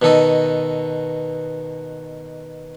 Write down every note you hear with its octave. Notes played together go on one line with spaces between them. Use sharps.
B2 D#3 A4 D#5